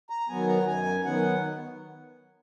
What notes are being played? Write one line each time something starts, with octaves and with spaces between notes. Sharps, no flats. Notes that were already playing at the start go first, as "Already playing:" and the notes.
A#5
D#3 F#3 B3 G#5
A#5
F#2 G#5
D#3 F#3 B3 F#5